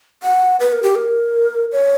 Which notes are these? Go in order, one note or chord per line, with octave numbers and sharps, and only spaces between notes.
F#5
B4
A#4
G4
A#4
C#5